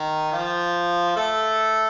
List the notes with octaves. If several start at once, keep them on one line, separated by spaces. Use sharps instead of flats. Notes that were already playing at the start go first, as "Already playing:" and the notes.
Already playing: D#3 D#4
F3 F4
A3 A4